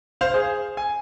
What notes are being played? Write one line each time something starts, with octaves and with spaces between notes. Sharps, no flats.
C5 F5
G#4 C5
G#5